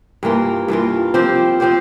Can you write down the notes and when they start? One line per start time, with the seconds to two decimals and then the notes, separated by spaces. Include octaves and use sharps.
0.23 G2 E3 A#3 F4
0.68 G2 E3 A#3 F4
1.14 F3 C4 G4 C5
1.60 F3 C4 G4 C5